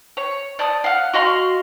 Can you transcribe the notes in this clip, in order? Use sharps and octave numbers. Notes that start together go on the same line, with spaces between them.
C#5
D5 A5 D#6
F5 F#5
F#4 D#5 F5 C6